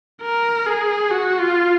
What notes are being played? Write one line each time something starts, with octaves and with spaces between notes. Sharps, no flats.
A#4
G#4
F#4
F4